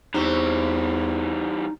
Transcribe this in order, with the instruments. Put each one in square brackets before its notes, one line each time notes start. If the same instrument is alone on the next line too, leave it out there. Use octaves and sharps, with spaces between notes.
[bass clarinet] E2 [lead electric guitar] E3 G3 [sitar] C4 F#4 G4 [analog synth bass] D#4